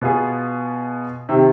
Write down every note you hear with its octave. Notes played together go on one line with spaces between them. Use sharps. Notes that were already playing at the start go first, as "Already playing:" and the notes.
B2 B3 F4 G#4
C3 D#3